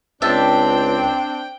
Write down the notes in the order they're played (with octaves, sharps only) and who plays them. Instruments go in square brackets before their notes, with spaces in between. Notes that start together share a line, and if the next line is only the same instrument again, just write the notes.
[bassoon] C#2 [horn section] C4 D4 [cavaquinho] E5 A5 [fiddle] G5